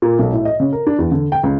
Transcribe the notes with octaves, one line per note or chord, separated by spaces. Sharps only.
A#2
B1
A2
D#5
C#3
A#4
D4
E2
D3
G5
C#2